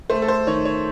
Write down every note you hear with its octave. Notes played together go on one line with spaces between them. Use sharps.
A3 C5
A4
C5
D#3 C#5
C#5